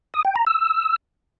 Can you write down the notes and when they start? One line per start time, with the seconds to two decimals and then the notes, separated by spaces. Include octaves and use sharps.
0.14 D#6
0.25 G5
0.36 A#5
0.47 E6